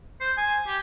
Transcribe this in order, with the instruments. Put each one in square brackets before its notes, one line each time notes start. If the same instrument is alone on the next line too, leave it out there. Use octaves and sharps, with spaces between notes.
[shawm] C5
G#5
G4